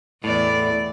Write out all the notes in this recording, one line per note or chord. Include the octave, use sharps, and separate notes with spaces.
E2 A2 E3 D5